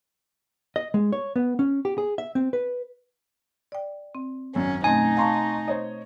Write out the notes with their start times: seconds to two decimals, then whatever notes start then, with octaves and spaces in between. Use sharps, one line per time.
0.76 D#5
0.94 G#3
1.12 C#5
1.36 B3
1.59 C#4
1.85 G4
1.98 G#4
2.18 E5
2.35 C4
2.53 B4
3.72 D5 G5
4.15 C4
4.55 G#1 F#2 C#4
4.84 B2 A3 C4 D#4 G#5
5.17 F5 A5 A#5 C6 C#6
5.68 C5 C#5 D#5